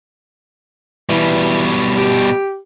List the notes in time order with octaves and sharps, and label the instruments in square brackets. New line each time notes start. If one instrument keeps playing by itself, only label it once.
[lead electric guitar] B2 G3 [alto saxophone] E3
[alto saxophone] G4